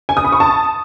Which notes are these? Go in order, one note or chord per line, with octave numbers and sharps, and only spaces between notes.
G#5
D#6
B5
C#6
A5